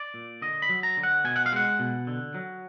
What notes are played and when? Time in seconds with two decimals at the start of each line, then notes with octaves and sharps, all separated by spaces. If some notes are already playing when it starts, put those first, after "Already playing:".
Already playing: D5
0.14 A#2
0.42 D3 D#5
0.62 B5
0.69 F#3
0.83 A#5
0.97 D3
1.03 F#5
1.24 B2 G#5
1.36 F#5
1.46 F5
1.52 G#3 F#5
1.79 B2
2.07 D3
2.35 F#3